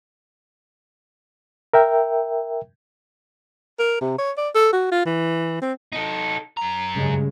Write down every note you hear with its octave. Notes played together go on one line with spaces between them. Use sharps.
A#4 E5 G5
A#4
C3
C#5
D5
A4
F#4
F4
E3
C4
D#4 A4
F#2 A#5
G2 C#3 G#3